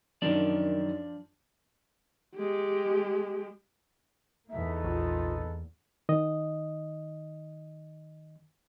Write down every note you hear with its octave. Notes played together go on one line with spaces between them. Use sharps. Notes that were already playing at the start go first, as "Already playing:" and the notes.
F#2 D#3 F3 D4 D5
G#3 G4
E2 G#2 A#3 B3 D#4 A4 E5
A#1 F4
D#3 D#5